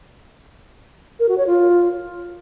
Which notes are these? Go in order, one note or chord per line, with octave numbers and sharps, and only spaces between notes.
A#4
F#4
C#5
F4